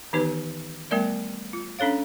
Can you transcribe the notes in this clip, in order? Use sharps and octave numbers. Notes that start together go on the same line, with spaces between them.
D#3 E3 B3 D#4 G4 B4
G3 A3 B3 A#4 D5 E5
F4
C#4 D4 A4 C#5 F5